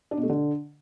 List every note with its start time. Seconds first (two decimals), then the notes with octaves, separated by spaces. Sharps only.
0.11 D4
0.17 B2
0.23 A3
0.29 D3